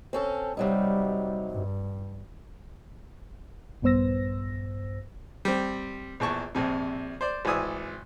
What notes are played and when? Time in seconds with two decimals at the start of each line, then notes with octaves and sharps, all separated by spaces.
0.13 C4 C#4 A4
0.57 C3 F#3 G3 D#4
1.51 G2
3.82 A#1 G2 B3 C5 E6 A#6
5.45 G3 C4
6.20 A#1 E2 A5 C#6
6.55 A#1 F2 C3
7.21 C5 D5
7.45 G#1 E3 D5 G#5 D#6 E6